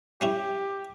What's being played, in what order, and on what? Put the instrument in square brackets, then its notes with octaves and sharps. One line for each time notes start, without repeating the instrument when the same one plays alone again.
[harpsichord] G3 C#4 E4 [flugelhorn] G4